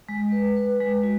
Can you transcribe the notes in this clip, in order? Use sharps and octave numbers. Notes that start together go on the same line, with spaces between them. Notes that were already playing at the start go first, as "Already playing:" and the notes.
G#3
B4
B4
G#3
F#4